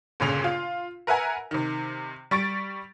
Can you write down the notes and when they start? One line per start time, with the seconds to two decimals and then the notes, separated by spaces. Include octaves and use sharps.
0.20 G1 A#2 C#3 F7
0.44 F4
1.07 A#4 B4 E5 F#5 G#5 A#5
1.51 C3 D#3
2.31 G3 C#6 A6 D7